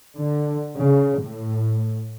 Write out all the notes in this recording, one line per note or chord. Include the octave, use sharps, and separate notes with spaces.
D3
C#3
A2